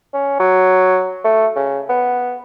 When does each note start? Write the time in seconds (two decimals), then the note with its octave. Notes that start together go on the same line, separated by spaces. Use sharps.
0.14 C#4
0.40 F#3
1.25 A3
1.56 C#3
1.89 B3